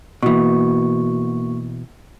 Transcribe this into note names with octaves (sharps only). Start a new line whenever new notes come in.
B2 E3 A#3 F#4 C#6